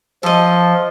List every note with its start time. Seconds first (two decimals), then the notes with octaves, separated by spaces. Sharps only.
0.23 F3 A4 D#5